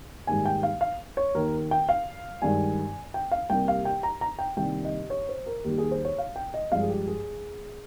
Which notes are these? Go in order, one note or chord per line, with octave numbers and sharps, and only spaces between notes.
G#2 D#3 G3 A#3 G#5
G5
F5
F5
C#5
D#2 D#3 A#3 A#4
G5
F5
G2 D#3 G#3 G#5
G5
F5
C2 C3 G3 A#3 G5
F5
G5
A#5
A#5
G5
C2 C3 D#3 G3 A#3 G5
D#5
C#5
C5
A#4
D#2 D#3 G3 G4
G#4
C5
C#5
F5
G5
D#5
G2 F3 G#3 F5
G#4
G4
G#4